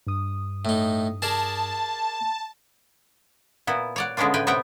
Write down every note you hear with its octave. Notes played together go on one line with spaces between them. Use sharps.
G2 D#6
A2 D#4
G#4 A#4 D5 A5
A#2 B3 E4
C#5 D5 F#5
D3 G#3 B3 C#4 D4 F4
A2 B4 G5 G#5
C3 B3 E5 F#5 G5